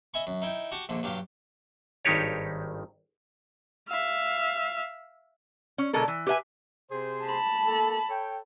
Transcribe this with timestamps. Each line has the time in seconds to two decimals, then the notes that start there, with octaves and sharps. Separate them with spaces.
0.14 D#5 E5 G#5 B5 C#6
0.27 F#2
0.42 D#4 E4 G5
0.72 F#4 G4 F#5 A5
0.89 A#1 A#2 D3
1.03 G2 F#3 G4 F5
2.05 G#1 G2 D#3 D#4 G4 C#5
3.89 E5 F5
5.78 C#4
5.93 B2 D3 G#3 A4 A#4
6.08 E3
6.27 G4 B4 E5 G#5
6.91 C3 G#4 C5
7.26 A5 B5
7.66 A#3 A4
8.09 A4 C#5 G5